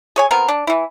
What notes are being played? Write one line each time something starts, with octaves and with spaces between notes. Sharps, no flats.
G#4 C#5 G#5
F3 B3 C4 A#4
D4
E3 E4